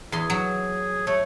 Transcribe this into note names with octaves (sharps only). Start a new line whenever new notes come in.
E2 G#4 C6
F#3
A3 C#5